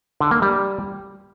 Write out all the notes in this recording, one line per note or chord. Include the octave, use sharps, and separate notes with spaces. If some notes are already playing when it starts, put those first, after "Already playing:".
D3
A#3
G3